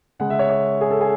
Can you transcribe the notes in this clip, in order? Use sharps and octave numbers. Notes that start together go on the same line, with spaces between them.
C#3 G#3 C#4 F#5
E5
C#5
C#5
G#4
A4
G#4